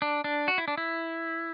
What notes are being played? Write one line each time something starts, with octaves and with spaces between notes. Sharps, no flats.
D4
D4
F#4
E4
D4
E4